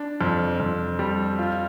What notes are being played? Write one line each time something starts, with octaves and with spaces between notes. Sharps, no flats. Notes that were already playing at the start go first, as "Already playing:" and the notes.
Already playing: D4
F2
F2
G3
F4